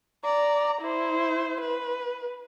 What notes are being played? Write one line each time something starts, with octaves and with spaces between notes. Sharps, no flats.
D5 A#5
E4 C5
B4